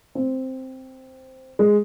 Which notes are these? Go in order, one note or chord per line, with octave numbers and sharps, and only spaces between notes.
C4
G#3